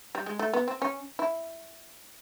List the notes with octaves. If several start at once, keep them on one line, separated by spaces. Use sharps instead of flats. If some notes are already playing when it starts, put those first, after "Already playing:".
G3
G#3
A3
B3
C4
C#4
E4